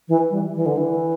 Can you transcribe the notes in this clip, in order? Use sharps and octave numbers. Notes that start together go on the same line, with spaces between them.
E3
G3
E3
D3
E3